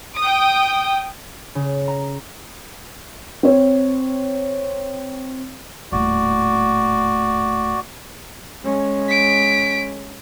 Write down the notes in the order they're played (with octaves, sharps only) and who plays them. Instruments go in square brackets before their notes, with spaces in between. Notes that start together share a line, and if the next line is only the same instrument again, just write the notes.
[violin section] G5 D#6
[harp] C#3
A#5
[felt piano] C4 C#5
[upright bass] D#1 A2 [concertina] F#4 D5
[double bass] G#3 C#4
[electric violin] B6 D7